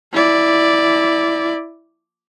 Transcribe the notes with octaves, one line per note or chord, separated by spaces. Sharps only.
E4 D5